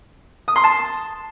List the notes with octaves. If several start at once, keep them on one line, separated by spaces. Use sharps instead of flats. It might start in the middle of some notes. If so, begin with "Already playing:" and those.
D#6
C6
A5